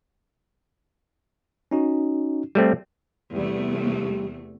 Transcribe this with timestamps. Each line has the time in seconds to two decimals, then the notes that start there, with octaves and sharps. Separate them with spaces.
1.71 C#4 D#4 F#4
2.55 G3 A3 C4
3.35 E2 C3 G3 A3